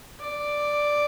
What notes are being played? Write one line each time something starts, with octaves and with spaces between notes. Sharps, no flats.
D5